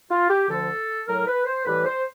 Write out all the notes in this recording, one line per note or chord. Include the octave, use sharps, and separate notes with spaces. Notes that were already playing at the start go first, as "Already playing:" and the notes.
F4
G4
D2 D3 F3 A4
A2 F#3 A#4
B4
C5
A2 E3 G3 B4
C5